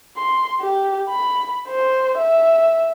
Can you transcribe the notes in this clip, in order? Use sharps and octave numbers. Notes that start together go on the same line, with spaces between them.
C6
G4
B5
C5
E5